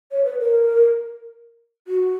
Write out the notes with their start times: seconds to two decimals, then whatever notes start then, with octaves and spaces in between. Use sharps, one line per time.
0.12 C#5
0.25 B4
0.39 A#4
1.88 F#4